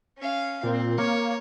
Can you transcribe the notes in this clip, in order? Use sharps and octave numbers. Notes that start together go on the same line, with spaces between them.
C#4 F5
A#2 C4
A#3 C#5